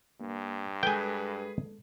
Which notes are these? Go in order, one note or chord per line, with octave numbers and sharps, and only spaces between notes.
G2 A#3
G#3 G#4 A4 B4 G5 G#5